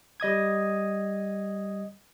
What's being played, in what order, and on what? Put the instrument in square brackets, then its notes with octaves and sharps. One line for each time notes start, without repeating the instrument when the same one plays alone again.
[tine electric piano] G3 D#5 D#6 G#6